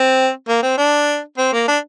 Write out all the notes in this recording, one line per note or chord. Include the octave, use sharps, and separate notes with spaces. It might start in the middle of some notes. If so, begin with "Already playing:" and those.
Already playing: C4
A#3
C4
D4
C4
A#3
D4